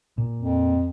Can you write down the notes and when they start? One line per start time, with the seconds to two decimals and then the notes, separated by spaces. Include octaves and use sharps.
0.18 A#2
0.36 F2